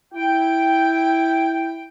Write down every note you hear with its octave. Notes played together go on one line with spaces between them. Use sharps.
E4 G5